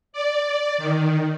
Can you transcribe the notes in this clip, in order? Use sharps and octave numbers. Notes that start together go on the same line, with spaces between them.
D5
D#3